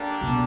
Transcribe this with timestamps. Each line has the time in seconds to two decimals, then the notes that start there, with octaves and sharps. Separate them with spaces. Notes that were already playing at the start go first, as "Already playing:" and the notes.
Already playing: D3 G3 A#3 D4
0.21 C3
0.27 B2